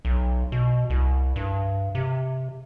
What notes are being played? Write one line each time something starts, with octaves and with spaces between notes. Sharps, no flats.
B1
B2
C2
G2
C3